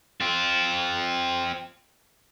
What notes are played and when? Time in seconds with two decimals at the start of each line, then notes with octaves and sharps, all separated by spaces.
0.21 C4 F4